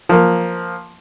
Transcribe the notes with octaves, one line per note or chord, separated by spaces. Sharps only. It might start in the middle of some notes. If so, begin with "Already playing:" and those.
F3 A#3